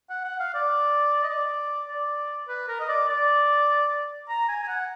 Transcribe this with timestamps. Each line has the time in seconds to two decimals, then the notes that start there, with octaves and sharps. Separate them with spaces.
0.10 F#5
0.24 F#5
0.40 F5
0.54 D5
1.24 D#5
1.29 D5
1.89 D5
2.49 B4
2.68 A#4
2.80 D#5
2.89 D5
3.09 D5
4.29 A#5
4.49 G#5
4.63 G#5
4.68 F#5